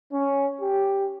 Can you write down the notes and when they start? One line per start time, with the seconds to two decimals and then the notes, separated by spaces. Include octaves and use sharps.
0.13 C#4
0.61 G4